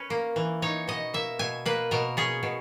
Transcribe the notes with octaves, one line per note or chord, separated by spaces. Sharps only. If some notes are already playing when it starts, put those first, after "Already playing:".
Already playing: C#4 B4
A#3
E3
D#4 C#5
B2 D#5
A#3 E5
B2 G#5
A#3 B4
B2 A#4
C#4 G#4
B2